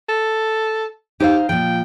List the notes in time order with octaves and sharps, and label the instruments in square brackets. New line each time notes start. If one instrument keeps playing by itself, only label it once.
[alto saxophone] A4
[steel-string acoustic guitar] D#4 C5 F5 [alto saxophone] G4
[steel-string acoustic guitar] A#2 F3 [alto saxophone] G5